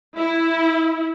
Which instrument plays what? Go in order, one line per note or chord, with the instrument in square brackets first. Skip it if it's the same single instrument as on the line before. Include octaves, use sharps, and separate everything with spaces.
[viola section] E4